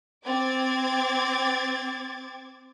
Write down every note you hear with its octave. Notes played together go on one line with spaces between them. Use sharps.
C4 D6 G#6 A6